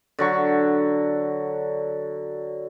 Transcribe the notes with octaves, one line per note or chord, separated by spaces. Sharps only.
D3 F#3 C#6